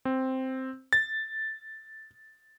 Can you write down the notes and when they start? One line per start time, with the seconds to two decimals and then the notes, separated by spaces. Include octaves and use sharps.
0.05 C4
0.93 A6